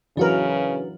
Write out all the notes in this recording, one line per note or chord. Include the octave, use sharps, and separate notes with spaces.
C#3 E3 F#3 D4 F#4 A#4 B4